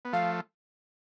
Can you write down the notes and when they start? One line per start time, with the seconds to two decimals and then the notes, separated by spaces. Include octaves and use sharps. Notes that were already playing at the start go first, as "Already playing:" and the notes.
0.05 B3
0.13 F3 A3 F5